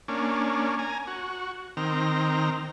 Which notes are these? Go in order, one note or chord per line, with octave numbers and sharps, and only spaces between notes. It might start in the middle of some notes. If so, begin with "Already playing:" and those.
A#3 C#4 D4
G#5 A#5
F#4
D#3 C4 A#5